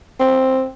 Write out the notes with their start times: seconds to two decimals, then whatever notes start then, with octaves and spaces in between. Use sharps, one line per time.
0.20 C4